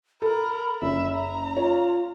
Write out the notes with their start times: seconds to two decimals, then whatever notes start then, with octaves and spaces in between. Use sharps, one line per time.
0.22 A4 A#4 B5
0.82 F#1 E5
1.15 A#5
1.57 F4 C#5